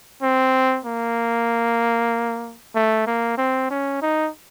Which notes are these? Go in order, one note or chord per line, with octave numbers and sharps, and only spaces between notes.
C4
A#3
A3
A#3
C4
C#4
D#4